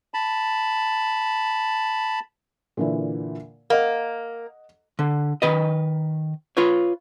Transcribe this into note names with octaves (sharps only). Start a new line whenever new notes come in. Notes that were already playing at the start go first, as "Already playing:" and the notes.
A5 B5
A#2 D3 E3
A#3 D#5 F#5
D3
D#3 B4 D#5
F4 B4 C#5